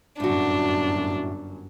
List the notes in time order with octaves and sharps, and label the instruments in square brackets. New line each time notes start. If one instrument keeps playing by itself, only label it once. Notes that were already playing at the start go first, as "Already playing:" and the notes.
[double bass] G1 F#2 [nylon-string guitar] A2 F#4 [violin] D4